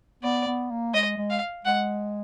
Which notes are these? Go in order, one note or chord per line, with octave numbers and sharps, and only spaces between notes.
B3 D5
B3
A#3
G#3 D#5
G#3
F5
G#3 F#5